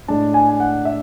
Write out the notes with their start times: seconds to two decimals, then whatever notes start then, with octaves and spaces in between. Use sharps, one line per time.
0.08 A2 G#3 D4 A5
0.34 G#5
0.49 G#5
0.60 F#5
0.85 E5